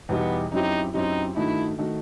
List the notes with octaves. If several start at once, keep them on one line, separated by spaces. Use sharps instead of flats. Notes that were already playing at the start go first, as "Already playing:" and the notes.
E2 B2 G3 B3 D#4 G4
F#2 F#3 C4 D#4 E4 G4
F#2 F#3 C4 D#4 E4 G4
G2 D#3 A3 D#4 E4 F#4
D#3 A3 D#4 F#4